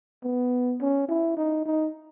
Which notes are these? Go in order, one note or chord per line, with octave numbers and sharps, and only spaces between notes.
B3
C#4
E4
D#4
D#4